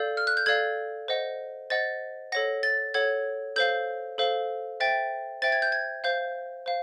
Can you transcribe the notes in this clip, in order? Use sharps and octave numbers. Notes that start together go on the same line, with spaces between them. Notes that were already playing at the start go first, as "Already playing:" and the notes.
Already playing: A4 D5 F5 G6
F6
F#6
G6
A4 D5 F5 G#6
C5 D#5 F#5
C5 D#5 F#5 A6
A4 C#5 F#5 A#6
A6
A4 C#5 F#5 G#6
A4 C5 F5 G6
A4 C5 F5
C5 E5 G5 A6
C5 E5 G5 A6
G#6
G6
G#6
C5 F5 G6
C5 F5